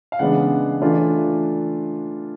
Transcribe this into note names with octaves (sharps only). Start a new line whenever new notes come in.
F5
C#3 E3 G#3 B3 D4 F#5
E3 A3 D4 F4